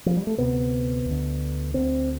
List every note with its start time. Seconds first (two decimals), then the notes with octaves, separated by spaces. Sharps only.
0.06 F3
0.17 G3
0.27 A3
0.37 D2 C3 B3
1.06 D2
1.11 D3
1.74 D2 D3 C4